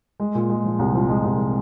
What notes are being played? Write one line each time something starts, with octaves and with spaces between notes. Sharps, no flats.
G#3
A#2
G#3
F3
C2
F3
G#3
C2